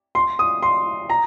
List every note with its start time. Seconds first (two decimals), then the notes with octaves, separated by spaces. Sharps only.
0.15 C6
0.39 D#6
0.62 C6
1.10 A#5